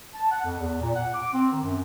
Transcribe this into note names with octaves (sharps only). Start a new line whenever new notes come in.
A5
F#5
F2
E2
A#2
F#5
D6
C4
D#3
F#2